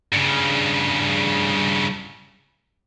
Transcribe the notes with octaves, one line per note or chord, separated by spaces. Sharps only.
G2 C#3